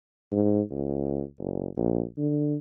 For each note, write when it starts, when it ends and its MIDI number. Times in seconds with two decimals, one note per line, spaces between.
0.32 0.61 44
0.71 1.23 37
1.39 1.67 30
1.77 2.03 34
2.18 2.56 50